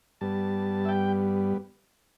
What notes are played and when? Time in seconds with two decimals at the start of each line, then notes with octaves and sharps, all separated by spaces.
0.21 G2 G3 B3 A5
0.85 E5
0.89 G5